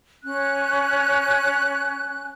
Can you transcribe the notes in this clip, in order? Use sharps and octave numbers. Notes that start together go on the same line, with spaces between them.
C#4 F#6